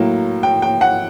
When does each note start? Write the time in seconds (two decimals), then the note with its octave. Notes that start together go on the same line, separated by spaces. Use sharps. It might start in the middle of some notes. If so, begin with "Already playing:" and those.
Already playing: A2 F#3 A#3
0.43 G5
0.62 G5
0.81 F#5